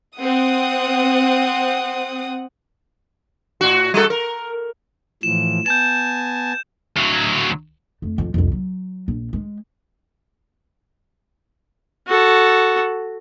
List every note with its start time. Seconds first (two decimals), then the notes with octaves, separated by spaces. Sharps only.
0.18 C4 F#5 D#6
3.61 A2 F#4
3.94 G3 F#4 A4
4.10 A#4
5.23 A2 E3 F3 E7
5.66 B3 G#5 A5 G6 E7
6.97 D2 F#3
8.02 F2 A3
8.18 F2
8.34 C2 F2
8.52 F#3
9.08 A#1
9.33 G#3
12.08 F#4 A4